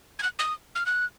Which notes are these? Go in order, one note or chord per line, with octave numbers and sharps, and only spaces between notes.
G#6
F#6
D#6
F6
F#6